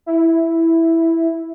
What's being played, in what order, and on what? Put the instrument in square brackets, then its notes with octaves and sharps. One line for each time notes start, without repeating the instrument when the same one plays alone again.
[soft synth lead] E4